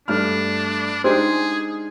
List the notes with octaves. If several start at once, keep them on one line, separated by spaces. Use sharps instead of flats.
G2 A3 D4 F6
G#3 D4 D#4 G4 G#4 C5